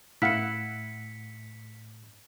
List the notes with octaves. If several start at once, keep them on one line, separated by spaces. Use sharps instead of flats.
A2 E4 F5 F#5 B6 C#7